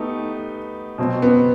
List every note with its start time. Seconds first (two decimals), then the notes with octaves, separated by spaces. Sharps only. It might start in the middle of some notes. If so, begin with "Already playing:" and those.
Already playing: A3 B3 D#4 G4
0.98 B2 F#3 C4
1.22 B3